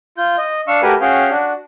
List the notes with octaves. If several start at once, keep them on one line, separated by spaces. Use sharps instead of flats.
F4 G6
D#5
D4 F5 C#6 E6
A3 F#4 G4 A#4 B4 G#5
C#4 F#4 G#4 F5 G5
D4 F#4